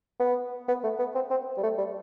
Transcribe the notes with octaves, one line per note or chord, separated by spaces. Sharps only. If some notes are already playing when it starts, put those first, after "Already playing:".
B3
B3
A3
B3
C4
C4
G3
A3
G3